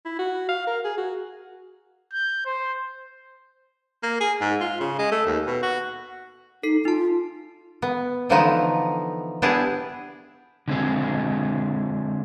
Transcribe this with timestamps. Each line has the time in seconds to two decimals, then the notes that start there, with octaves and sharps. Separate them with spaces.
0.05 E4
0.19 F#4
0.49 F5
0.67 A#4
0.85 G#4
0.98 F#4
2.13 G6
2.46 C5
4.03 A#3
4.21 G#4
4.41 G#2
4.61 F4
4.80 C#3
4.99 G#3
5.12 A3
5.26 D#2
5.47 B2
5.63 F#4
6.63 D#4 A4 C7
6.85 D#4 F4 A5
7.82 B3
8.29 D3 E3 F3 A3 B3 D#4
9.42 B3 D4 E4 G4 G#4 A5
10.68 D3 G#3 C4 G#4